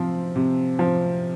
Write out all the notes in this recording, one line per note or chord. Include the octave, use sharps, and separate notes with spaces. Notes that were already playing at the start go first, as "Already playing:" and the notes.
Already playing: C3 F3 C4
C3
F3